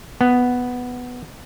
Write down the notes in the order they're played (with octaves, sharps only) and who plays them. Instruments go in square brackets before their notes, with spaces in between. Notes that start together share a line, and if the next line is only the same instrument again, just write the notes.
[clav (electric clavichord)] B3